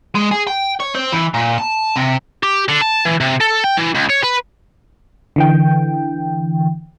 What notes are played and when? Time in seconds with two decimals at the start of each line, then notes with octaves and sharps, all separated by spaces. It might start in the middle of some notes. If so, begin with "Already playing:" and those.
0.15 G#3
0.31 G#4
0.47 G5
0.80 C#5
0.95 C4
1.13 E3
1.34 A#2
1.58 A5
1.96 C3
2.43 G4
2.69 D3
2.81 A5
3.05 E3
3.21 C3
3.41 A4
3.64 G5
3.77 E3
3.95 C#2
4.10 C#5
4.24 B4
5.36 D3 E3 G5